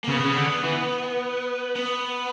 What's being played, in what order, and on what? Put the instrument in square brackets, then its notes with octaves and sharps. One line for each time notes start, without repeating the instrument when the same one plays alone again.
[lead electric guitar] A#3
[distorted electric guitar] C#3 [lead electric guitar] B3
[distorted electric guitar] C#3
D3
E3
[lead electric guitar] B3